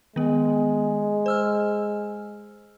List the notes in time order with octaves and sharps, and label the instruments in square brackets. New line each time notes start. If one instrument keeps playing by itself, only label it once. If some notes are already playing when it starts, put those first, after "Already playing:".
[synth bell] D#3 B3 [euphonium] G#3
[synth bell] C5 E6 F6